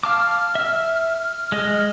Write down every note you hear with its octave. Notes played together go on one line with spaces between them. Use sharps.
F5 A5 D6 F6
E5 E6
G#3 D#5